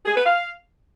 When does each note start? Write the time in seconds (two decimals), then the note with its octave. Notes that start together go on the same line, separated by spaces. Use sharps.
0.06 G#4
0.16 B4
0.26 F5